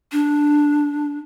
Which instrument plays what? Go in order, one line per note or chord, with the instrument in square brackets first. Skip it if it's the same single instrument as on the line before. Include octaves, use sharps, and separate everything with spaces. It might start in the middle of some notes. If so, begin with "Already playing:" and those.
[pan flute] D4